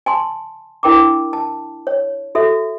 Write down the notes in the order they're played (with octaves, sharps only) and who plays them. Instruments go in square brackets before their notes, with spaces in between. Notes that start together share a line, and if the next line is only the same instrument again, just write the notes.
[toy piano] G#5 A5 C6
D4 E4 A#4 G5 A#5 D6
A5
C#5
F#4 A4 E5